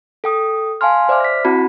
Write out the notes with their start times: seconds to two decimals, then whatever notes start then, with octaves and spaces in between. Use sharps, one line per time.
0.24 A4 G5 D#6
0.81 F5 G#5 A5 C6 F6
1.09 C5 D5 E5 D6 F6
1.20 A#6 B6
1.44 C4 E4 F#4 A5 B5